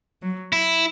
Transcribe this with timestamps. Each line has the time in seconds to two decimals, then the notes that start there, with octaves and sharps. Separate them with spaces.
0.22 F#3
0.53 E4